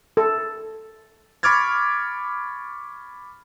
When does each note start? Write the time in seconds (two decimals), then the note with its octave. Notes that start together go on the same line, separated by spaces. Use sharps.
0.17 A4
1.43 B5 C#6 D6 F6 G#6 A6